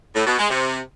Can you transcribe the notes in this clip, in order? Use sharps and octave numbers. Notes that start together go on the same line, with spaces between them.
A2
B2
G#3
C3